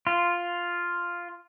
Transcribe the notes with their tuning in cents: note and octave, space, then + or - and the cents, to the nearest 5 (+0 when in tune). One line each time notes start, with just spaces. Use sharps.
F4 +0